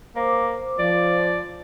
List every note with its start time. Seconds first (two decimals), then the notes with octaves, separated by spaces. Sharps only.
0.16 A#3 C5 D6
0.79 F3 D5